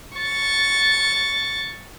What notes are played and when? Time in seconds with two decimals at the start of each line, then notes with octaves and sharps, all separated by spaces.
0.18 C#6 A6